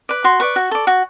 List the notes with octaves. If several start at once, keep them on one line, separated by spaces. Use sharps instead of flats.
B4 D5
F#4 C6
B4 D5 C#6
F#4
A4 D5
F#4